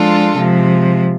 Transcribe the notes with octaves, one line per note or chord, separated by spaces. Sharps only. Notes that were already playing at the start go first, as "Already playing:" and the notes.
Already playing: F3 G#3 D4 F4 A4
C3 F3 G#3